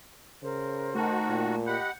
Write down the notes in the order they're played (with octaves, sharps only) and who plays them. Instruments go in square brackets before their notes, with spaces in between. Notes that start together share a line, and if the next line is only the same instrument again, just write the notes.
[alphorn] C#3 [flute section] A#4 C5
[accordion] D#3 F#4 [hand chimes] A3 A5
[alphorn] A#2
[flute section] G4 D#5 B5 [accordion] F#5 [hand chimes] G6 C#7